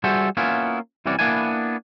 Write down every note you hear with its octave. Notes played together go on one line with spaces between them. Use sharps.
G3 F#4 G#4 A4 C5 E5
A#3 B3 C#4 E4 F4
C2 C3 E3 C#4 F#4 D5
A#3 B3 D4 E4 G#5